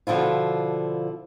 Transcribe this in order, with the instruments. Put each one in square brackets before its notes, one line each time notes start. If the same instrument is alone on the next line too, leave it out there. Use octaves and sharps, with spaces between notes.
[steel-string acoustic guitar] B2 D3 F3 E4 F4